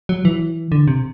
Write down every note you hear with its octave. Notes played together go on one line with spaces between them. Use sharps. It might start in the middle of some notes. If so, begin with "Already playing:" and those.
F#3
E3
D3
C3